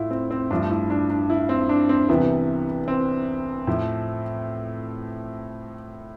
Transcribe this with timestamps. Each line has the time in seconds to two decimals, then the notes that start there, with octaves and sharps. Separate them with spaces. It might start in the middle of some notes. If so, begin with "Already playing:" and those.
Already playing: A2 A3 E4 F4
0.11 C4
0.31 C4
0.50 G2 F3 A3 D4
0.71 E4
0.90 D4
1.10 D4
1.30 E4
1.49 C4
1.69 D4
1.89 C4
2.09 C2 C3 E3 B3
2.88 C4
3.67 A2 F3 A3